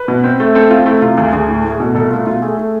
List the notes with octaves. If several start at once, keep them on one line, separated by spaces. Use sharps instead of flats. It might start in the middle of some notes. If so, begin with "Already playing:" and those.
Already playing: B4
B2
C4
A3
C4 A4
C4 F4
A3 E4
C3 F4
D2 F4
D2 G#4
A2
A2
G#4
B2 A4
C2 A4
A3 F4
B2 F4
A3 G#4
A3